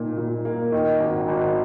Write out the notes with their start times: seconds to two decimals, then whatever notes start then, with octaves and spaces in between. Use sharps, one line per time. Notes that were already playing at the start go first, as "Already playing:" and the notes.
Already playing: A#2 D#4
0.17 A#2
0.45 A#3
0.72 D#3
1.00 G#1
1.28 G#1